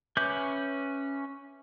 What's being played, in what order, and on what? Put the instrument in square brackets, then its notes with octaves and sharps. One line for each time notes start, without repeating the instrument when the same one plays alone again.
[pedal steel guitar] C#4 B4 E5 D6 G6